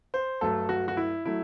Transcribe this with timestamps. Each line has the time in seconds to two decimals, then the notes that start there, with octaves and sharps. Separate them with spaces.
0.14 C5
0.41 G2 F#3 A3 A4
0.69 F#4
0.88 F#4
0.97 E4
1.25 F#3 A3 E4